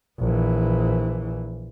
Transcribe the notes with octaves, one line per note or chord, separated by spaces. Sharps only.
A#1 E3